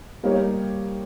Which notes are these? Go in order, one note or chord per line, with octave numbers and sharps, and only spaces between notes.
G3 A#3 D#4 G4 C#5